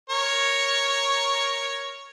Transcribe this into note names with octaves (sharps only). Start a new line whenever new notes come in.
A#4 C#5